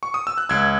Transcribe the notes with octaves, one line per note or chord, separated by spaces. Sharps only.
C#6
D#6
E6
F#6
C#2 E6 G#6